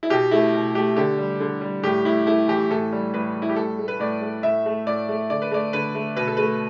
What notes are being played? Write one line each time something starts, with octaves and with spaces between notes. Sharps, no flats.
E4
B2 G4
A3 E4
B2
A3 G4
D3 G4
G3
D3
G3
A2 G4
A2 E4
A3 E4
E3 G4
A2 A4
G3
A2 B4
G3
E4
G4
A2 A4
A3
B4
A2 D5
A3
A2 E5
A3
A2 D5
A3
D3 D5
B4
A3 D5
D3 B4
A3
B2 B4
A4
A3 B4